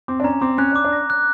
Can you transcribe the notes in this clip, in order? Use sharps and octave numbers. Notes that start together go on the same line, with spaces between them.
C4 D6
D4
C#4 A#5
C4 D6
C#4 F#6
D4
D6
D4
A#6
F#6